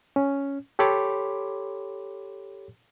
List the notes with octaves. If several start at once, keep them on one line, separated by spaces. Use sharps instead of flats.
C#4
G4 A4 C#5 B5 C6 D6